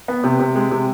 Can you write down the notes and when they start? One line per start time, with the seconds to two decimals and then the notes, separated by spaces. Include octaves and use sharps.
0.08 B3
0.24 C3
0.39 C3
0.55 G#3
0.71 C3